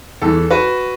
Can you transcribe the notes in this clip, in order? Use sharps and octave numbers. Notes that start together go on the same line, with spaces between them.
E2 E3 A4
F#4 B4